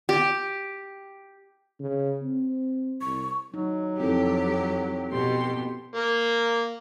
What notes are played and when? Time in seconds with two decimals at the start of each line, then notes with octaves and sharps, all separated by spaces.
0.09 G4
1.80 C#3
2.22 C4
3.01 C2 C#6
3.54 F#3 D#4
4.00 F2 C4 E4 G4 A4
5.12 B2 G4 C6
5.96 A#3